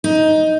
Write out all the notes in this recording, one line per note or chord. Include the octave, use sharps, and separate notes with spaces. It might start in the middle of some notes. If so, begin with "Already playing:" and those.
D#4